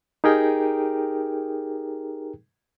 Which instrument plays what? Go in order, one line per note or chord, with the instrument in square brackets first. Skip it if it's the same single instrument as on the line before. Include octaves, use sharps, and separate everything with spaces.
[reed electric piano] D#4 G4 G#4 A#4 G5